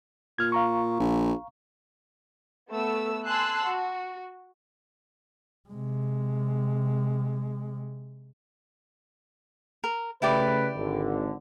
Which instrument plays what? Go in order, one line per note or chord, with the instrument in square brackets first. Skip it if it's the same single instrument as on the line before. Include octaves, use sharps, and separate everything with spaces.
[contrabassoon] A#2 [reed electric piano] F6 G#6
[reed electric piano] F5 A#5 C#6
[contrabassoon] A#1
[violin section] A3 B3 E6
G#5 A5 C6 E6 F#6 C7
F#4
[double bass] C3 G#3
[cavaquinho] A#4
[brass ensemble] C#3 A3 B4 [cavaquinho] E4 G4 D5
[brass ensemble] G#1 D3